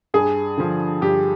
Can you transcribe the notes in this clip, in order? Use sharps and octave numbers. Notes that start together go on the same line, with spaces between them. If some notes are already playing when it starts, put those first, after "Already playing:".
G2 G#4
D3 F3
G2 G4